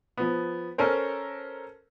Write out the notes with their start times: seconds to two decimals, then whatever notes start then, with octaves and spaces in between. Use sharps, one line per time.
0.17 F3 B3
0.78 C#4 A4 A#4 C5